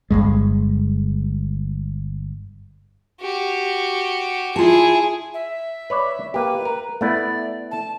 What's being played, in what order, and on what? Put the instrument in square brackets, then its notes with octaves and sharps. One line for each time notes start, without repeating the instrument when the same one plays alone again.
[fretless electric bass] G1 C2 G2 G#3
[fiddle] F#4 G4
[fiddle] E4 G#4 [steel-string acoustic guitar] F4 A5
[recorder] E5
[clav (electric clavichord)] B4 C#5 D5
[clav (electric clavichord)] A#3 G4 [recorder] B4
[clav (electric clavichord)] A#4
[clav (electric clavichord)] A3 B3 E4 [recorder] D5
[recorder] A5